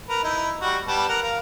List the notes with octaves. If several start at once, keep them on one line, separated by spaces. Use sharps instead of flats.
A#4 B4
D#4 E4
G3 F#4
G3 B3 A5
A#4 F#5
A#4 F5